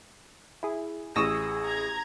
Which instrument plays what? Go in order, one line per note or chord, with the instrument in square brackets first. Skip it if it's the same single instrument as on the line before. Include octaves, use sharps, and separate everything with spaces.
[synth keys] E4 G#4
[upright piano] A1 C#6 [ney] G#4 [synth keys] D#6 E6 A#6
[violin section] A#5 G#6